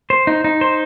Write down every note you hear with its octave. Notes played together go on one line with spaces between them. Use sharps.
C5
D#4
D#4
C5